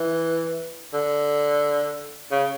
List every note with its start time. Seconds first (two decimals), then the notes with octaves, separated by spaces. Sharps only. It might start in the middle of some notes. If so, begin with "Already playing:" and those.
Already playing: E3
0.94 D3
2.32 C#3